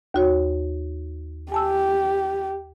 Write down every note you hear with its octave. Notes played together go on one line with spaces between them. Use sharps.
D#2 F#4 C#5
G4 G#5 A5 E6